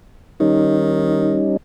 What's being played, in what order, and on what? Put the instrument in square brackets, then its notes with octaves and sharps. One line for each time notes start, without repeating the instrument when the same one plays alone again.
[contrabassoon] D#3 [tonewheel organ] G3 C#4 D#4